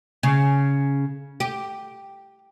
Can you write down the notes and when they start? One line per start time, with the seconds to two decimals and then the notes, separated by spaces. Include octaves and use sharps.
0.23 C#3
1.40 G4